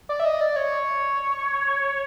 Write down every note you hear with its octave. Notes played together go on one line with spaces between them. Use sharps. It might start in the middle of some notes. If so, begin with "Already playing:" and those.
D5
E5
D#5
D5
C#5